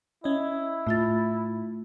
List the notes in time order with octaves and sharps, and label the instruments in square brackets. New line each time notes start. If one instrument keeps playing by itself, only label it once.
[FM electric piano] C#4 D#5 [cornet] E4
[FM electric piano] A2 [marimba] A3 F4 A6